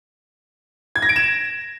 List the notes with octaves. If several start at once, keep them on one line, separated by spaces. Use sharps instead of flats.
G#6
A#6
D7
E7